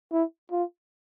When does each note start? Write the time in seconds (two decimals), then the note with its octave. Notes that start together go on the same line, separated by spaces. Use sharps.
0.13 E4
0.52 F4